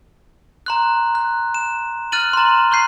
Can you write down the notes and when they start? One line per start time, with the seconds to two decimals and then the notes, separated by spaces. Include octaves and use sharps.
0.66 A#5 C6 F#6
1.15 F#6
1.54 E7
2.12 F6 F#6 A6 D#7 F#7
2.33 A#5 C6
2.72 C#6 F#6 G6 C7 D#7